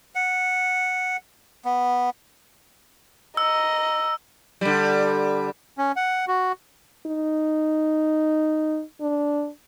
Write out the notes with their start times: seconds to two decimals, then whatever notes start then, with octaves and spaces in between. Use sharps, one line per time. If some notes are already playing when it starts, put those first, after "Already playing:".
0.15 F#5
1.65 B3
3.37 D#5 A#5 E6
4.61 D3 G3
5.78 C#4
5.96 F#5
6.28 F#4
7.07 D#4
9.01 D4